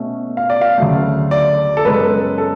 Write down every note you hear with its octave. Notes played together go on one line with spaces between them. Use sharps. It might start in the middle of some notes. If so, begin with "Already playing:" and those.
Already playing: B2 A3 C#4
F5
D5
F5
D2 C#3 F#3 A3
D5
A4
F#2 C#3 G#3 B3 B4
A4